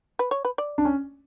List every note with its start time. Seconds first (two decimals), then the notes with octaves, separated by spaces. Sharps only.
0.19 B4
0.31 C#5
0.45 B4
0.58 D5
0.78 D4
0.85 C#4